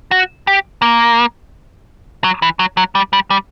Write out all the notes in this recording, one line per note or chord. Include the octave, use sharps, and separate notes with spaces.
F#4
G4
A#3
F#3
E3
F#3
F#3
G3
G3
G3